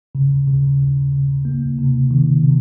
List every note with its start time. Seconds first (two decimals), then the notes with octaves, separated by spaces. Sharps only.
0.15 C#3
0.47 C#3
0.80 C#3
1.13 C#3
1.45 A#3
1.79 C3
2.11 D#3
2.43 C3